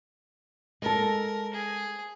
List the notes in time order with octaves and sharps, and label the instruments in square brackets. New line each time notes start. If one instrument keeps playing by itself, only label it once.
[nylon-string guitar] G#3 A4 [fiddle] A#4
[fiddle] G#4